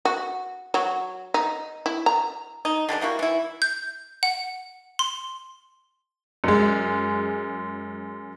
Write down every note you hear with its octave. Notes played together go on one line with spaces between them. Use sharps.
F#4
F#3
D#4
E4
A#5
D#4
D3 G3 G#3 D4
G3 A#3 E4 F#4
E3 E4
G6
F#5
C6
F#2 G#3